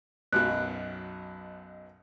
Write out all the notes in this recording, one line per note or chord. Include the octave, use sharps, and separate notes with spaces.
B1 F#2 B2 F#6